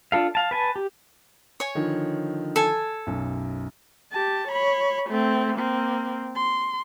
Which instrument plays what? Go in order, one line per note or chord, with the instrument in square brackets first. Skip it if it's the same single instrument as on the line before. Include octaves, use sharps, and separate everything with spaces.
[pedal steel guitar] D4 F4 A4 F5
F5 A5
B4 G#5 A5
G4
[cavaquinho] C#5 G#5
[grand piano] D3 D#3 F3
[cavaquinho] A4 G#5
[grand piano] B1 F#2
[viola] G4 A5
C#5 B5
A3 C4
A#3 C4
C6